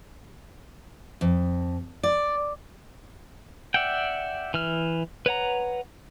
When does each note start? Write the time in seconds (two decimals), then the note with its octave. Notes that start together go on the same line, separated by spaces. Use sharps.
1.21 F2
2.03 D5
3.74 D5 E5 F#5 G5
4.54 E3 F6
5.26 B4 C#5 F#5 A#5